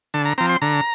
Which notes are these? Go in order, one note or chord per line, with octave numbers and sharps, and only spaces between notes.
D3 A5
A#5
F3 C4 A#5
C6
D3 A#5